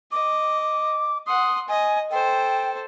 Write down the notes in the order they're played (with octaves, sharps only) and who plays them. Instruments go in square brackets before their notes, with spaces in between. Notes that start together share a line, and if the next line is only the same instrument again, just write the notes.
[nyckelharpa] D#5 [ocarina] D6
[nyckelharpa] F#5 C6 [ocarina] D#6
[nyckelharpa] D#5 [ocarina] G#5
[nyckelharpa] A4 C5 [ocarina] G5